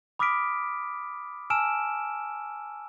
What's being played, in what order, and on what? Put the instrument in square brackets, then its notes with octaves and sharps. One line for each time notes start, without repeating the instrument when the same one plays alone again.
[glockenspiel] B5 D6 D#6 F6 B6 D7
G#5 A5 E6 F6 D7 E7